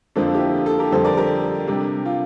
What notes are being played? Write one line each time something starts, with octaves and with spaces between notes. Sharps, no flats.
F2 D3 F3 A#3 D4 A4 C5
E4 G4
F4
F4 A4
G4 A#4
F2 D3 G3 A4 C5
A#4 D5
G4 A#4
C3 G3 D4
F4